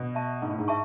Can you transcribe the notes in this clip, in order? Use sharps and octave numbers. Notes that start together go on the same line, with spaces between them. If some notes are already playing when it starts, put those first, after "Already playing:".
Already playing: B2
E5 A5 C#6
G#2 G#4
A2
G#2
E5 A5 C#6